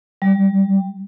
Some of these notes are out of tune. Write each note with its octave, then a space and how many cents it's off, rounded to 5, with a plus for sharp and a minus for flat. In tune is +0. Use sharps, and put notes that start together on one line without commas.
G3 +5